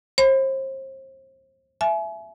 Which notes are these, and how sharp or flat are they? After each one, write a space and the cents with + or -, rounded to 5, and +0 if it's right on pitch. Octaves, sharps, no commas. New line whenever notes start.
C5 +35 B5 +40
E5 +15 G#5 +35